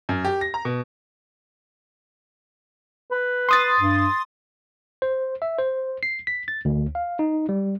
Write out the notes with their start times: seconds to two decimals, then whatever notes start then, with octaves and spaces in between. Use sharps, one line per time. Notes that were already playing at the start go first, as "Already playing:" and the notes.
0.09 F#2
0.24 G4
0.41 A#6
0.54 A#5
0.65 B2
3.12 B4
3.49 C6 D#6 A6
3.80 G2
5.02 C5
5.42 E5
5.59 C5
6.03 C7
6.27 B6
6.48 A6
6.65 D2
6.95 F5
7.19 D#4
7.49 G3